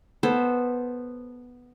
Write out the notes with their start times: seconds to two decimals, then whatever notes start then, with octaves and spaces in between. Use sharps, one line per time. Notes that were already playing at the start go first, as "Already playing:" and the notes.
0.23 B3 A4 C5